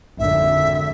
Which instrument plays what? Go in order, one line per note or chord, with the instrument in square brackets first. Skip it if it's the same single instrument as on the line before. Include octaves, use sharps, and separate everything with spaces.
[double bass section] G#1 F2 D3 [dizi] E5